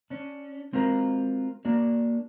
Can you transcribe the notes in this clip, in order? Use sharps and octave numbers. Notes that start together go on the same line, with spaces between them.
C#4 D4
G#3 C4 F4 F#4 A#4
A#3 D4 F#4 D5